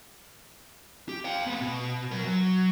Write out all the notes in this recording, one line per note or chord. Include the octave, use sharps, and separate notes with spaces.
G4
F5 G5
A#3 B3
B2
F#3 A#4
F#3